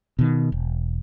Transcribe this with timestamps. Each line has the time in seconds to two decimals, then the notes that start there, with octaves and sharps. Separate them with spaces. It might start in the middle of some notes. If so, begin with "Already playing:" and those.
0.19 B2 D#3
0.52 E1